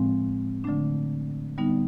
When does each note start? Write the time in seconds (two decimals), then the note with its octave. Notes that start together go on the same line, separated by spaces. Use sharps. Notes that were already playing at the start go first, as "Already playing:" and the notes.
Already playing: A2 F3 G#3 C4
0.64 D3 F#3 A3 D4
1.58 D3 G3 B3 D#4